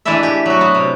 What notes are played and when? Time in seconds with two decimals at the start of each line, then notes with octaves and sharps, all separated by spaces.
0.05 E3 G#3 A3 D4 E4 E5
0.23 G4
0.46 F#3 F#4
0.61 B3
0.75 C3